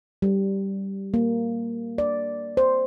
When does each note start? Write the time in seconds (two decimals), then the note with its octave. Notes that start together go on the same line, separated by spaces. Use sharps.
0.22 G3
1.14 A#3
1.98 D5
2.57 C5